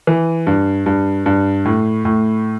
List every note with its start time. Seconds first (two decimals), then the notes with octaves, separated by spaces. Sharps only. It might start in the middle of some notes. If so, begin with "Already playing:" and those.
0.07 E3
0.47 G2
0.86 G2
1.26 G2
1.65 A2
2.05 A2